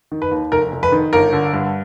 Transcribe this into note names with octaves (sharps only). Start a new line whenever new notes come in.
D#3
B4
D#2
F1 A#4
F1
B4
D#3
G1 A#4
D3
G2